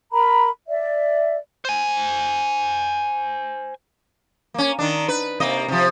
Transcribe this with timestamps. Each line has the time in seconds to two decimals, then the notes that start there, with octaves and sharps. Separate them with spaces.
0.13 A#4 A#5 B5
0.68 D5 E5
1.65 C5 G#5
4.54 A#3 C#4
4.79 D#3 D4
5.08 B4
5.40 C3 A#3 D#5
5.68 C3 F3